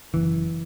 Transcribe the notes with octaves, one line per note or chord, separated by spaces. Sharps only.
F#1 E3